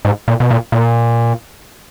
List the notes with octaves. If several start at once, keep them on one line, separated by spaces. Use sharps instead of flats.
G#2
A#2
B2
A#2
A#2